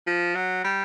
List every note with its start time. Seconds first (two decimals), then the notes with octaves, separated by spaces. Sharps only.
0.07 F3
0.35 F#3
0.64 G3